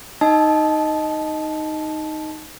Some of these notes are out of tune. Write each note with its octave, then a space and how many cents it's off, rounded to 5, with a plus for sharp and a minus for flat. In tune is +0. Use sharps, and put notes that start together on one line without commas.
D#4 +0 D#5 +0 A5 -15